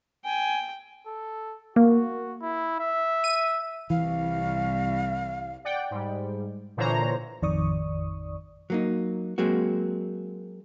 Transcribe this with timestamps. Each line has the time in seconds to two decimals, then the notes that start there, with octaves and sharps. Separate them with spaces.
0.24 G5 G#5
1.07 A4
1.76 A#3 F#4
2.41 E4
2.80 E5
3.24 D#7
3.90 C2 E3 F5
5.65 D5 F#5 G5
5.91 G#2 G3
6.77 A#2 D3 E3 C5 C#5 A#5
7.42 A1 F2 D#3 D5 C#6 D#6
8.70 F#3 A#3 D#4
9.38 F#3 G#3 A#3 C4 F#4